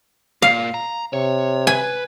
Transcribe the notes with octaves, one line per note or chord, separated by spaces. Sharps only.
A#2 F5
A#5
C3 C#5
B4 G#5